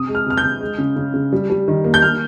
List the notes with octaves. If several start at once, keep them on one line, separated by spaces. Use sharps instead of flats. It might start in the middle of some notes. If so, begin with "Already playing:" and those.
Already playing: C3 D#6
G#3
F6
C3 F6
G6
C3
G#3
C#3
C#3
C#3
G3
G3
D#3
A#3
G6
A#3 F6